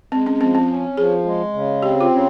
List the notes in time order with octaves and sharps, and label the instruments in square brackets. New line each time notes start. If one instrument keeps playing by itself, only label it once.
[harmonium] G#3 [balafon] C4
[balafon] C#4
[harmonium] F3 [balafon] C4
[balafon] C4
[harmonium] C#4
[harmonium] F3 [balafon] G#4
[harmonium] G#3
C#3
[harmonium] C4 [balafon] G4
[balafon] F4
[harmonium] C#3